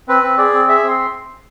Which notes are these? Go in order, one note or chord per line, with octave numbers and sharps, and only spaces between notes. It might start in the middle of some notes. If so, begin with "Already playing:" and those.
C4 B4
C4
G#4 D5
C4
G#4 E5
C4 C6